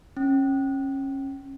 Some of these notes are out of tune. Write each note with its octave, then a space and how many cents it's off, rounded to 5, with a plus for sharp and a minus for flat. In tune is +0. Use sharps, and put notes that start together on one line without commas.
C#4 -25